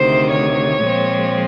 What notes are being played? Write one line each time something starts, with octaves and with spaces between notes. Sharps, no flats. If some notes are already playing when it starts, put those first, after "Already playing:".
Already playing: D2 C3 D#3 C5
C#5
A#2 F3 G#3 C4